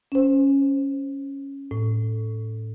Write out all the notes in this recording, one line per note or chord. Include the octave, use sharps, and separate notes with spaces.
C#4 C5
A2